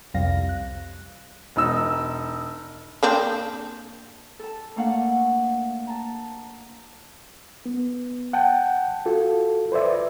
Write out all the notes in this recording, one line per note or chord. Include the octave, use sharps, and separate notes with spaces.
C2 F2 C3 G3 F5 A#6
F#6
E1 D#4 E6
A#3 C4 D4
A4 A5
A3 A#3 D4 F5 F#5
A5 A#5
B3
F#5 G5 A5
F4 F#4 A4
B4 C5 D5 E5